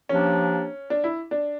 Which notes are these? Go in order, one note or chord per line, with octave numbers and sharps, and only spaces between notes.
F3 A#3 C#4 D4 G4
D4
E4
D4